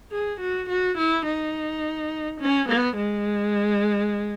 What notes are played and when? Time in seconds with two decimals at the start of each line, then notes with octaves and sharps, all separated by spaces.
0.11 G#4
0.40 F#4
0.69 F#4
0.97 E4
1.25 D#4
2.40 C#4
2.68 B3
2.96 G#3